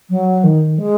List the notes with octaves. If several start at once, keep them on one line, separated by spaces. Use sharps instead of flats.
F#3
D#3
G#3